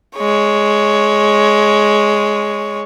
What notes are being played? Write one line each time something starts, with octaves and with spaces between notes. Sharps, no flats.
G#3 C#5